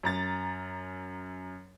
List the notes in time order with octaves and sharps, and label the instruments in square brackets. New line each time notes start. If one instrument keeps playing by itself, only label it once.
[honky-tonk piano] F#2 A#5 A6